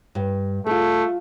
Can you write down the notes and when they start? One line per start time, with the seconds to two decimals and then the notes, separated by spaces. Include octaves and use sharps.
0.15 G2
0.67 A3 F4 G#4